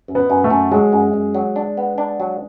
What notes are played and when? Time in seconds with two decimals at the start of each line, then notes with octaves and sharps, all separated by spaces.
0.08 F#2
0.15 B3
0.30 F#2
0.44 A3
0.50 F#2
0.71 F#3 G#3
0.92 F#2
1.13 F#2
1.35 F#3
1.56 D4
1.77 B3
1.98 D4
2.20 F#3